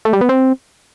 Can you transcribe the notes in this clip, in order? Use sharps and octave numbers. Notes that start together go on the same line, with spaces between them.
A3
G3
B3
C4